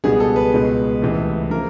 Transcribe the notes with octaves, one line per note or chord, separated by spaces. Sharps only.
C#2 B2 G3 B3 G#4
A4
B4
C#2 B2 G#3
C#2 C3 E3 A3
C#3 F3 A#3 A#4